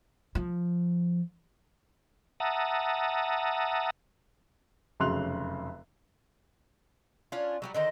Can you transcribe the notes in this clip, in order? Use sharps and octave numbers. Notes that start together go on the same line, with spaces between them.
F3
E5 F#5 A5 A#5 D#6
F1 F#2 C#3 C6 F#6 F7
C#4 D4 F4
F#3 G3 F#4
D3 D#3 C5 D#5